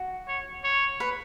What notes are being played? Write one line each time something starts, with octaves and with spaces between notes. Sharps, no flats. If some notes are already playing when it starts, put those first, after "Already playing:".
Already playing: F#4
C#5
C#5
B4